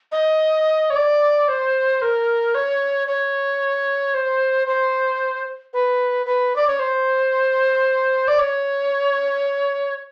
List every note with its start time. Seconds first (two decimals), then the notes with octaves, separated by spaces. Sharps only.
0.12 D#5
0.90 C#5
0.96 D5
1.48 C5
2.02 A#4
2.55 C#5
3.07 C#5
4.14 C5
4.67 C5
5.74 B4
6.26 B4
6.56 D5
6.67 C#5
6.79 C5
8.28 D5
8.39 C#5